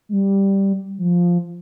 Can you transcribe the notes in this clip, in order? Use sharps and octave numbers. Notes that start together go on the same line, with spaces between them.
G#3
G3
F3